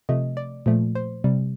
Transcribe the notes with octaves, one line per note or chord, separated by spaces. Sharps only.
C3 F3 A3 D#5
D5
A#2 F3 A3
C5
C3 G3